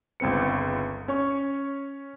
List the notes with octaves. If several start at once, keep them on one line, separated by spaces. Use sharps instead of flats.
G1 C#2 C4 B4 C#7
C#4 C#5 C#6